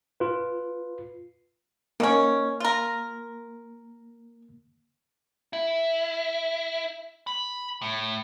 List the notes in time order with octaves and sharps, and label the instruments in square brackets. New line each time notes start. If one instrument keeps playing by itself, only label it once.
[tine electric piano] F4 B4
[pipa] D#3 C#4 [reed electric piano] A#3
[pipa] F4 A#4
[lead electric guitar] E4
B5
A2